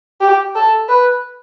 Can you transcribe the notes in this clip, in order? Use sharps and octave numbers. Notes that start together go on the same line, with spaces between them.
G4
A4
B4